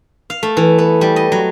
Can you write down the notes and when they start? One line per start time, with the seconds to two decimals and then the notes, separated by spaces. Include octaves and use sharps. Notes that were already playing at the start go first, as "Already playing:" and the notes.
0.30 F5
0.43 A3
0.57 E3
0.78 B3
1.01 G3
1.16 D#5
1.32 F#3